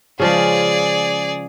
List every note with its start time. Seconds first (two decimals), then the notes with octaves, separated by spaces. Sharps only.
0.20 C#3 F3 G#3 G#4 D5